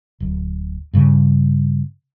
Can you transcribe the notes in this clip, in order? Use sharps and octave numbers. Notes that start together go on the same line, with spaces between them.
D1
G2 C#3